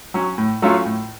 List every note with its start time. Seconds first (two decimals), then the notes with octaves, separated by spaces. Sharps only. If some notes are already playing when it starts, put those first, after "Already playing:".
0.14 F#3 C#4
0.38 A2
0.62 F#3 A3 C#4 F4
0.85 A2